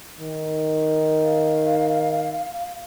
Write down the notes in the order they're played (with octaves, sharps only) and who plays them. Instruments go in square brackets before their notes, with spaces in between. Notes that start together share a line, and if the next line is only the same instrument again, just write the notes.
[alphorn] D#3
[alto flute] F5